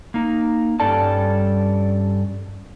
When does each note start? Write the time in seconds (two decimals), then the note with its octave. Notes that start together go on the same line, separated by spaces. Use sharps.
0.14 A#3 D#4
0.80 G2 G3 C#4 A4 D5 A5